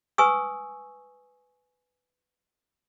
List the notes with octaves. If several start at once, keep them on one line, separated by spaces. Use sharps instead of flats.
B4 G#5 C#6 D#6 E6